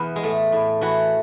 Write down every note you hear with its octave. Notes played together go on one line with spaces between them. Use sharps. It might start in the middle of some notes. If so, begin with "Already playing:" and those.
Already playing: E2 B2 B3
G#3
A2 A3
A2
E3 F#4